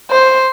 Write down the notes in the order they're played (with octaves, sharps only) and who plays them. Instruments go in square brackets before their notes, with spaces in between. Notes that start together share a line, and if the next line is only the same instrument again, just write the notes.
[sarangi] C5